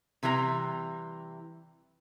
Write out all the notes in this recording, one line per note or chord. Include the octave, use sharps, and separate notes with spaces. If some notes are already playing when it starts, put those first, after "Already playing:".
C3 E3 G3 F#4 A#5